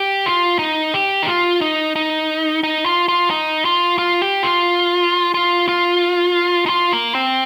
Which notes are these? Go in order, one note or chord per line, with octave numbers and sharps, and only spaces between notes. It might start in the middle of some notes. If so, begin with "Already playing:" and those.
Already playing: G4
F4
D#4
G4
D#4
F4
D#4
D#4
D#4
F4
F4
D#4
F4
F4
G4
F4
F4
F4
D#4
F4
A#3
C4